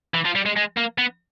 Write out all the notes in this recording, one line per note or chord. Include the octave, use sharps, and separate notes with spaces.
E3
F3
G3
G#3
G#3
A#3
B3